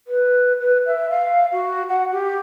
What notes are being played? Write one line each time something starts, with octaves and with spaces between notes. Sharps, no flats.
B4
B4
E5
F5
F#4
F#5
G4